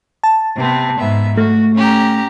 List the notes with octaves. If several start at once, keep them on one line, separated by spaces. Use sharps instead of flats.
A5
C3 B3 C4
G#2 B3 E5
A3 F#4
C#4 G4 A#5